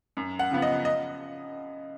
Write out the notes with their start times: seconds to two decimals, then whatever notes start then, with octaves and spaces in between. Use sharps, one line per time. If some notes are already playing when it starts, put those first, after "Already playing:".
0.17 F#2
0.39 F#5
0.51 C#3 F3 B3
0.62 D#5
0.85 D#5